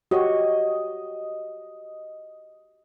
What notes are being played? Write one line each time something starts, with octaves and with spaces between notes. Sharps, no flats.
F#4 G4 C#5 D#5